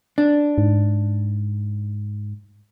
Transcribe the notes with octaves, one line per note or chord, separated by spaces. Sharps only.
D4
G#2